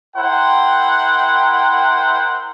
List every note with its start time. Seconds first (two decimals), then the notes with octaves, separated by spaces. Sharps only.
0.17 E4 A#4 C5 F#5 G5